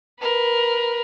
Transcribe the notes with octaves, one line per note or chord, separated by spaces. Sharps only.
A#4 B4